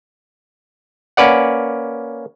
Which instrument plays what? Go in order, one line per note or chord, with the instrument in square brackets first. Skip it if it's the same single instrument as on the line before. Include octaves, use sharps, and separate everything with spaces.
[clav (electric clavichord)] A#3 C#4 B4 D5 F#5